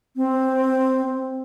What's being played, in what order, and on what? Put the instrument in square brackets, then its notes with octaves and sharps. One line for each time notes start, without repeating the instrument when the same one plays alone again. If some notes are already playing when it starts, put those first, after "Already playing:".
[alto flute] C4